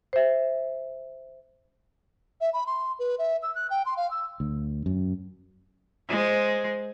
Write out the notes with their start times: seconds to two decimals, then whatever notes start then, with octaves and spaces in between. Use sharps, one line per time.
0.13 C5 E5
2.41 E5
2.54 B5
2.67 C6
2.99 B4
3.19 E5
3.43 E6
3.55 F#6
3.70 G5
3.86 C6
3.97 F5
4.11 E6
4.40 D2
4.86 F#2
6.09 G#3 C5